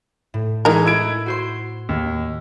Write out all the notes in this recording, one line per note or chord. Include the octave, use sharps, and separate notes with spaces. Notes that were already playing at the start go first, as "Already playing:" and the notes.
A2
E3 G#3 D#4 A#4
E4 G#6 D7
F#4 C5 C6
D#2